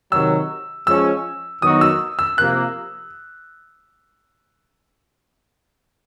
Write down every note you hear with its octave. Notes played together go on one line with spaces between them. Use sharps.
C3 D#3 F#3 E6
F3 G#3 C#4 E6
D#3 F#3 B3 D#4 F#4 D#6
E6
E6
C3 F3 A#3 F#6